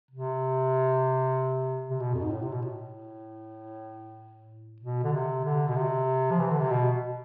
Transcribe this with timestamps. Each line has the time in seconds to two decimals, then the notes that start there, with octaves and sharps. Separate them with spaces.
0.11 C3
1.90 C3
2.00 B2
2.14 F2
2.22 G#2
2.31 A2
2.42 C3
2.52 B2
2.62 A2
4.82 B2
5.03 D3
5.12 C3
5.45 D3
5.68 B2
5.76 C3
6.31 F3
6.40 E3
6.51 D3
6.61 C3
6.70 B2